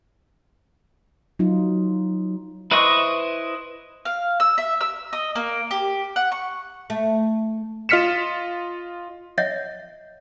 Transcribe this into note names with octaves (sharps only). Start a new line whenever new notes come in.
F#3 D#4 F4
E4 B4 C5 D#5 C#6
F5
E6
E5
E6
D#5
A#3
G4
F#5
C#6
A3
F4 D#5 F6 B6 C#7 E7
C#5 D#5 E5 F#5